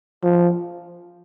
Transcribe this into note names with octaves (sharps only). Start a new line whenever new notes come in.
F3